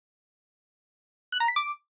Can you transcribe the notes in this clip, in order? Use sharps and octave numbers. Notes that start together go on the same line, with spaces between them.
F#6
A#5
B6
D6